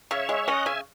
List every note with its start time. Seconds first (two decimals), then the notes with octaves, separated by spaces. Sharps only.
0.11 C#3 C#5 E5
0.29 G#3
0.47 C#4 D#5 F#5
0.66 C#3 E5 G#5